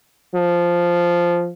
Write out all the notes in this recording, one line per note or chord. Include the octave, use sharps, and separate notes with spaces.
F3